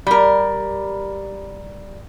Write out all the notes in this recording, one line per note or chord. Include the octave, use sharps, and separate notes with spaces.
G3 A#4